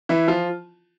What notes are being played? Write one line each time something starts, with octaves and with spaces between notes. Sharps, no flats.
E3 E4
F3 F4